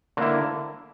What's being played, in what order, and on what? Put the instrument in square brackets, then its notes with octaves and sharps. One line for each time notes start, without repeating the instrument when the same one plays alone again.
[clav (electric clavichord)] D3 A#3 E4